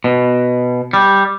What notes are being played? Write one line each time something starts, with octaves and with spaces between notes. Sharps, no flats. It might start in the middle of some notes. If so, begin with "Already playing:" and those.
B2
G3